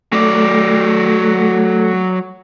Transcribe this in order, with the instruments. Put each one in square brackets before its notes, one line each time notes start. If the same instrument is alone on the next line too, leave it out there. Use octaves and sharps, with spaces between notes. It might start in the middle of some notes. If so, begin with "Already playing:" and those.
[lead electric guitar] F#3 D5 [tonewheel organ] A3